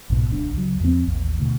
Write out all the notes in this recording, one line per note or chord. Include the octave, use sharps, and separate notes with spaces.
B1 G#2 B2
D1 C2 D4
C#2 F#3
E2 F3 G3 C4
A1 D#2
D2 B2